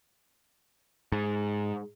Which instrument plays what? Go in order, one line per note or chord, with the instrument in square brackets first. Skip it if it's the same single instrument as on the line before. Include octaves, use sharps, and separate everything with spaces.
[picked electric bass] G#2